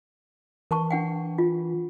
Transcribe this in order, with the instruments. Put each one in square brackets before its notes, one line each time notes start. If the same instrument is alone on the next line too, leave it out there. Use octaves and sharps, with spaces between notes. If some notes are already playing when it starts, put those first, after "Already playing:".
[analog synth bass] E3 [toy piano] A#4 A5 C#6
[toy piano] D4 F#5 G5
F4